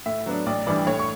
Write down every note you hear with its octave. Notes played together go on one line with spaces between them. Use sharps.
A2 E5
F#3 B3 D4
A1 D5
G2 E3 G3 D5
A2 C#5
C#6